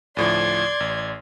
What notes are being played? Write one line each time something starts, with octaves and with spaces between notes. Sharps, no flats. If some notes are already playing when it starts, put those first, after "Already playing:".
D2 A2 F3 D5 C6 G#6
A1